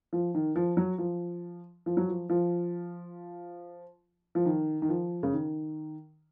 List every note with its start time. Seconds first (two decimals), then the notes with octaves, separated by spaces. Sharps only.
0.13 F3
0.34 D#3
0.56 F3
0.77 F#3
0.98 F3
1.86 F3
1.97 F#3
2.08 F3
2.29 F3
4.35 F3
4.46 D#3
4.82 D#3
4.89 F3
5.23 C#3
5.33 D#3